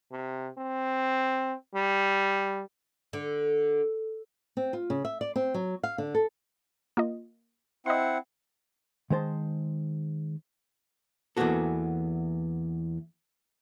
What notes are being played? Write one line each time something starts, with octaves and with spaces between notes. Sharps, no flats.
C3
C4
G3
D3
C4
F4
C#3
E5
D5
C4
F#3
F5
D3
A4
A#3 F4 D#5
C4 E4 D#5 F#5 C6
D#3 G#3 C5 A5
E2 E3 A#3 B3 F#4 A4